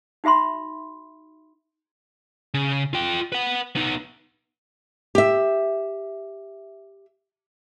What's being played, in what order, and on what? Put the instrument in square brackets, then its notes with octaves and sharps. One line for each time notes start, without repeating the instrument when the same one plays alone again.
[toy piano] D#4 F#4 E5 B5 C6
[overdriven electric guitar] C#3
F4 G5
B4 F#5
B3 D#4
[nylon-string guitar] G4 E5